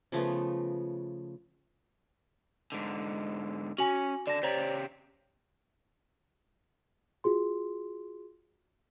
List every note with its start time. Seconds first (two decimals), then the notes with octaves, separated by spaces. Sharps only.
0.12 C#3 F3 A3 B3
2.72 G#2 D3
3.78 C#4 F#4 G#5 F#7
4.27 D3 D5 A5 A#6
4.43 C#3 G4 C5 C#5 A#5
7.24 F4 F#4 G#4 C6